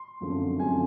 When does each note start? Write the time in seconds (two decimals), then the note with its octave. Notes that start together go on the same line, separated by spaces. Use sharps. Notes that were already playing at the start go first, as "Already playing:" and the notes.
Already playing: C6
0.21 F#2 D3 F3 A3 C4
0.59 F#2 D3 F3 A3 C4 G#5